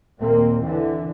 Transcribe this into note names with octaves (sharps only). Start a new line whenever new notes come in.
D#2 A#2 A#3 C4
D3 E3